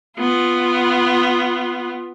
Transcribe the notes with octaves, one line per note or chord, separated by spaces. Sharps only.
B3 F4